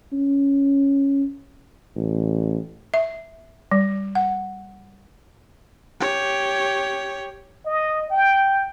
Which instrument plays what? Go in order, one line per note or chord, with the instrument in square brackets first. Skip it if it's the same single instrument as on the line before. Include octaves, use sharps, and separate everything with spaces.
[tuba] C#4
A1
[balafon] E5
G3
F#5
[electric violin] G4 C#5
[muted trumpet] D#5
G5